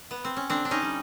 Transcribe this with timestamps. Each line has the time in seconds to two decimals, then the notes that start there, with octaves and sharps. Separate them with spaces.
0.11 B3
0.25 C4
0.36 C#4
0.49 D3 C4 D4
0.65 D4
0.71 C#4 D#4
0.82 G3